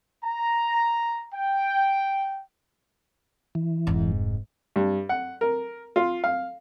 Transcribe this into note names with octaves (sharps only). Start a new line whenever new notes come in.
A#5
G5
E3
F1 G#2
G2
F#5
A#4
F4
F5